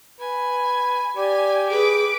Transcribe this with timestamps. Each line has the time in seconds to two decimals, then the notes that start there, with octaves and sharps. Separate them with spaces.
0.20 B4 G#5
1.17 G4 D5 G#5
1.70 G#4 B4 D6